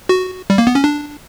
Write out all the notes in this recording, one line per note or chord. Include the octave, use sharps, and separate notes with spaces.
F#4
G3
A#3
B3
C#4
D4